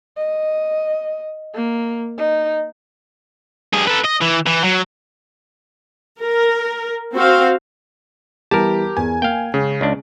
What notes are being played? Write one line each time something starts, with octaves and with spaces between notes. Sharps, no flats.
D#5
A#3
D#4
G2 G#4
A4 B4
D#5
E3
E3
F#3
A#4
C4 F#4 C5 F5
E3 G3 B3 G4 A#4 A5
E2 G#4 G#5
A#3 F5 G5
C#3 G#3 C#4
C#2 D4